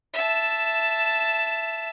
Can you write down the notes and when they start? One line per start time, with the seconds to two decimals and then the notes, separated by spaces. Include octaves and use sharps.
0.14 E5 A5